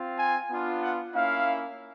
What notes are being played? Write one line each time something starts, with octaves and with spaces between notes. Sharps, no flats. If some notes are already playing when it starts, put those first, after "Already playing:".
Already playing: C4 F4
G#5
B3 D4 F4
F#5
A#3 C#4 E4 F5